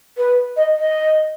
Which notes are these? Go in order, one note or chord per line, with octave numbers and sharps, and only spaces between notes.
B4
D#5
D#5